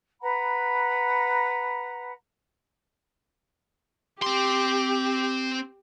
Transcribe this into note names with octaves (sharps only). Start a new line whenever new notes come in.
B4 F#5 A#5 B5
C4 G4 C6